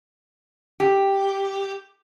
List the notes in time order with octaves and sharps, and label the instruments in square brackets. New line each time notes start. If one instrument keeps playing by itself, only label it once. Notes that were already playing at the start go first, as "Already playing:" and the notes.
[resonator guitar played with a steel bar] G4